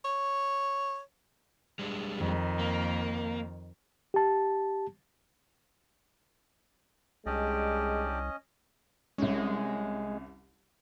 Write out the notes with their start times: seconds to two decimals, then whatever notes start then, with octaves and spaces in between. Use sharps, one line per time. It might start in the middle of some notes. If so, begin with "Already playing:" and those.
0.04 C#5
1.79 G3 G#3 D4
2.17 F2 D#3
2.59 A#3
4.14 G4 A5
7.26 C2 G#3 C#4 D4 G4 D5 D#5
9.18 C2 G#3 C#4